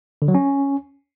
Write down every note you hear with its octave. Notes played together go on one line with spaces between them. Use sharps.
D3
F#3
C#4